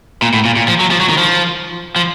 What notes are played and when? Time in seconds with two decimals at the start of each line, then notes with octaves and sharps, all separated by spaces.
0.22 A#2
0.34 A2
0.45 A#2
0.56 A#2
0.68 F3
0.80 F#3
0.91 F3
1.00 F#3
1.09 D#3
1.18 F3
1.96 F3